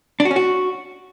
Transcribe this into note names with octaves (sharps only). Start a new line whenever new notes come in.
D4
F#4
C#4
F#4